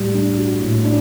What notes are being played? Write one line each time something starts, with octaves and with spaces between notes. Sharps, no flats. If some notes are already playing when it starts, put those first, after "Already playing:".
Already playing: A2 G3
D4
F#4
A2
D4